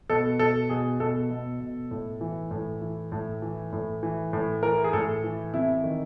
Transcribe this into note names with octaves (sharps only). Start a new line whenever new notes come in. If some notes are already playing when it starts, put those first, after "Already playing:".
B2 A4
B2 A4
B2 G#4
B2 A4
B2
B2
A2
E3
A2
E3
A2
E3
A2
E3
A2
E3 A#4
G#4
A2 A4
E3
C3 E4
D#3